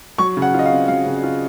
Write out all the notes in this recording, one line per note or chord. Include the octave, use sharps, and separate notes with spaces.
F#3 C#6
C#3
F#5
F4 D#5
F5
C4
F#3 F5
C#3
F4